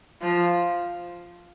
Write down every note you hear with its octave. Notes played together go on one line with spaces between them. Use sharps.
F3